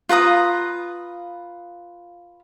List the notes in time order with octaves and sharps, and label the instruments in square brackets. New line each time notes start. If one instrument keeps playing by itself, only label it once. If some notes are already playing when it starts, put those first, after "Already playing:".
[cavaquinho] F4 B4 A#5 D#6